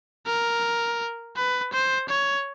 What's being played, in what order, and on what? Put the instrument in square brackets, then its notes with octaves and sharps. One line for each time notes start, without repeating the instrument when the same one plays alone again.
[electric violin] A#4
B4
C5
C#5